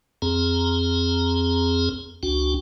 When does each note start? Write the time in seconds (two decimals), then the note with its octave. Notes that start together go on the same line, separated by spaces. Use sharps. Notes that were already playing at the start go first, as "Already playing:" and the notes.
0.22 F2 C4 G#4 A#5
2.23 C#2 D4 F#4 G5